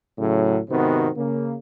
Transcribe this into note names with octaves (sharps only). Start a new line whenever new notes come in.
A2 C#3 F#3
G#2 C3 D#3 B3 F#4 C5
C#3 A#3